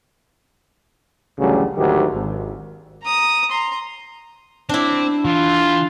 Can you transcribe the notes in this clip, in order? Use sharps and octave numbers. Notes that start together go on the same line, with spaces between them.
A1 D2 C#3 F#3 G3
D2 G#2 D#3 F#3 G4
G#1
A#5 D#6
A#5 C6
C4 D4 E4
E3 F4